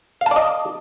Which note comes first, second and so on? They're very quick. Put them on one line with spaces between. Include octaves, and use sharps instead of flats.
F5 A5 D5 D#5